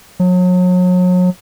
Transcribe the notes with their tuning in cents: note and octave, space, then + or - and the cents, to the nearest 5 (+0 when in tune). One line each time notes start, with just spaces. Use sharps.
F#3 -35